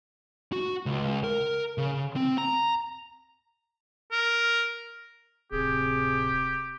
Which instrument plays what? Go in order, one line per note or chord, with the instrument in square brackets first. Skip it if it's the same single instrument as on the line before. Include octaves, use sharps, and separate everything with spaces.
[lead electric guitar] F#4
C#2
A#4
C#3
C4
A#5
[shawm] A#4
[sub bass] D1 [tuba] C3 [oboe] G4 [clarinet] G#4